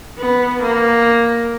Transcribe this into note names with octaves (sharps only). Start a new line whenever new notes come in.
B3
A#3